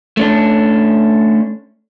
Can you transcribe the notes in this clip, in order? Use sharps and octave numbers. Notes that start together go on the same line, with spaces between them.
A3 C#4 D4